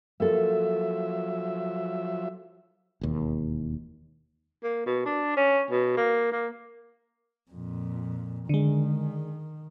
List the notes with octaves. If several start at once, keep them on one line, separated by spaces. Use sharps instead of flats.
F3 F#3 A#3 A4 E5
E1 D#2
A#3
B2
D4
C#4
B2
A#3
A#3
F2 A#2
D3 D#3 G#3